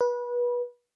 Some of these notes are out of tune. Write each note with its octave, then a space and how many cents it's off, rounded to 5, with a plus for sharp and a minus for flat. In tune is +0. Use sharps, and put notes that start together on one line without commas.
B4 -25